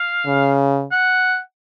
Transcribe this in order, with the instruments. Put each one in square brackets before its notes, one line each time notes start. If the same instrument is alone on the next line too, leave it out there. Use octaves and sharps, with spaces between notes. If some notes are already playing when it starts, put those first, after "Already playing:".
Already playing: [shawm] F5
[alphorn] C#3
[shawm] F#5